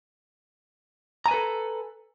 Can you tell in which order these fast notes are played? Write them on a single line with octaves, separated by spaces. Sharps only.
A#5 G#5 B4 A4